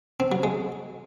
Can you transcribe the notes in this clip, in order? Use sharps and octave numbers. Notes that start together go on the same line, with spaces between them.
C4
F#3
G#3